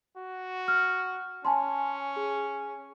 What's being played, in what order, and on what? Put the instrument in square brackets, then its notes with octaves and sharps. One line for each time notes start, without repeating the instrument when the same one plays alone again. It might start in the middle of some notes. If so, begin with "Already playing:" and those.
[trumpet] F#4
[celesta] F6
[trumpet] C#4 [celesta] G#5 A5 C6
[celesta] G#4